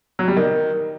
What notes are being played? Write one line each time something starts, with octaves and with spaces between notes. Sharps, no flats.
F#3
G3
D#3